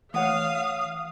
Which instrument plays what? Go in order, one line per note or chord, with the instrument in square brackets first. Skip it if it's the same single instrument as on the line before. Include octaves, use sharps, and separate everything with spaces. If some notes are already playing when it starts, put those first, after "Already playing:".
[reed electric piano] E3 C#5 [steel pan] A3 F#5 [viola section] F5 [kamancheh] D#6